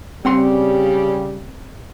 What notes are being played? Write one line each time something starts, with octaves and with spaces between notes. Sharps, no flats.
C#3 G3 C4 G4 F#5 C6